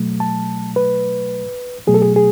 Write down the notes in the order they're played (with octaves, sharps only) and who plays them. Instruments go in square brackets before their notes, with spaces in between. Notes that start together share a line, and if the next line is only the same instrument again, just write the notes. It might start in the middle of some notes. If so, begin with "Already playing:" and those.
Already playing: [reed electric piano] B2 F#3 A3
A5
B4
B2 F#3 A3 G#4
A4
G#4
G#4